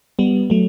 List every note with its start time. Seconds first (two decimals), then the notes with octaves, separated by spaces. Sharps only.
0.19 G3 B3
0.50 F#3 A3